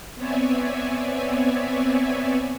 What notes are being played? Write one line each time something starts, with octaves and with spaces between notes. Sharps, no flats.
B3 C4 C#5 D5 E5 G#5